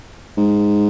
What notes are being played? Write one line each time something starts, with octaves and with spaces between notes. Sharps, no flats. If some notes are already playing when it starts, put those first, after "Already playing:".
G#2